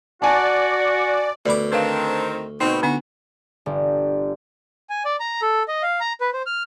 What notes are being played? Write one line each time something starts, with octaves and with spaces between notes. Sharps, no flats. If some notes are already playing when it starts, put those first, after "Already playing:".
F#4 D5 G#5 A5
D2 B2 D5 B5 D6
D#3 C4 D4 B4 F5
B2 C4 D#4
D3 B3 D4 F#4
G1
G#5
D5
A#5
A4
D#5
F5
A#5
B4
C5
F6